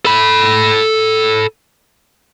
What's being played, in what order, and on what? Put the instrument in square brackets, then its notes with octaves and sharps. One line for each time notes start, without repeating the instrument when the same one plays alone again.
[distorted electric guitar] A4 B5